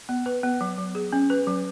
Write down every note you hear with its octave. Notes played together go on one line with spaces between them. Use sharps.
B3
B4
B3
F#3
F#3
G#4
C#4
B4
F#3